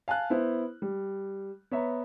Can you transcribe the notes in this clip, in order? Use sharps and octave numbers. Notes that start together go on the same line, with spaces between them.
F5 G#5 A5 F#6
B3 E4 C5
G3
B3 C#5 E5 A#5